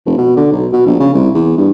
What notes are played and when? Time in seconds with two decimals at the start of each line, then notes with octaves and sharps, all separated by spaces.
0.06 F1
0.18 B2
0.37 D3
0.52 B1
0.72 B2
0.86 A#1
1.00 C#3
1.14 C2
1.34 E2
1.58 G2